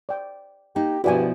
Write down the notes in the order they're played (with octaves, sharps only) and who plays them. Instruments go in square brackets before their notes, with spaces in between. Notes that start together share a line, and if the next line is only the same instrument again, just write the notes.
[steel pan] D5 G5
[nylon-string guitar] A#3 D#4 [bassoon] G4
[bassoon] G2 [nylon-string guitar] B2 F3 E4 [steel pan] F#4 D5 G#5